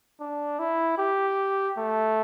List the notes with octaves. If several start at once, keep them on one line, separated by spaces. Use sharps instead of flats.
D4
E4
G4
A3